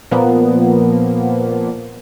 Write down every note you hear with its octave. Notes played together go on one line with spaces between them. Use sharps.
A#2 F3 A#3 B3